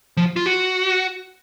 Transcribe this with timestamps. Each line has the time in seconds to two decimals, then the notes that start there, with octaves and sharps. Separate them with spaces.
0.17 F3
0.36 F4
0.46 F#4